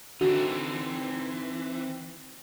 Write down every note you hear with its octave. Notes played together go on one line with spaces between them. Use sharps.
D3 E3 C4 D#4 F#4